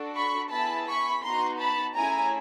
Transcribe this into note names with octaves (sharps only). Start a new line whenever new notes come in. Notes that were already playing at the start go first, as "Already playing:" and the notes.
Already playing: D4 F#4 A4
B5 C#6
B3 E4 G#4 A5 B5
B5 C#6
B3 D#4 F#4 A#5 C6
A5 B5
A3 C#4 E4 G#4 G#5 A#5